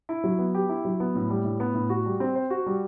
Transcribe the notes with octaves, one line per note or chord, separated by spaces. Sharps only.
E4
F#3
B3
G4
E4
F#3
B3
A2
G3
A2
B3
A2
F#4
G3
C4
C5
F#4
G3